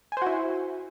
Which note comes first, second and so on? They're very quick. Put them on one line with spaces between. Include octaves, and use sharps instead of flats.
G#5 C5 F#4 E4